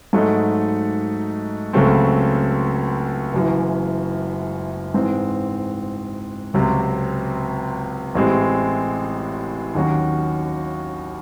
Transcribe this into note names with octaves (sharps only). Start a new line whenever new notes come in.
G#2 F#3 A3 D#4
C#2 C#3 F#3 A3 C4
F#1 F#2 E3
G#2 E3 C4
C#2 C3 F#3 C4
A1 A2 G#3 C4
D#2 D#3 F#3 C#4 F#4